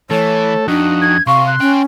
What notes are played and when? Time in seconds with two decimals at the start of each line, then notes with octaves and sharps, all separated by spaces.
0.10 E3 A3 A4 C#5
0.68 F2 D4 D#4 F#4
1.01 G#6
1.27 C3 F5 C6 C#6
1.47 F#6
1.60 A#3 C#4 G5